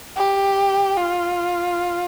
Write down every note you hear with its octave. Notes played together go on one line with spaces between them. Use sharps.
G4
F4